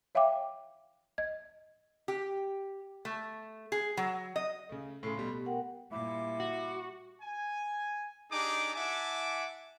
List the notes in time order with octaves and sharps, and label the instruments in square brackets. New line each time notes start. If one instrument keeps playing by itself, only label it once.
[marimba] C#5 E5 F5 G5 D6
D#5 G#6
[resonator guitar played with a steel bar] G4
A3
G#4
F#3
D#5
[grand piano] C#3 A3
[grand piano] A2 C#3 [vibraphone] A3 A4 C6
[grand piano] B2 G3
[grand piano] B2 [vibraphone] G4
[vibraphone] A#4 F#5 G5
[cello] A#2 G3 [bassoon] E4 [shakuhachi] D6
[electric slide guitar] F#4
[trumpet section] G#5
D4 D#4 G4 G#4 D6
E4 E5 F#5 G#5 A5 D6